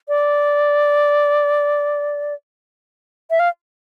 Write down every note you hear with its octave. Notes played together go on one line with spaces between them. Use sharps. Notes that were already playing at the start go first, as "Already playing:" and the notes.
D5
E5
F5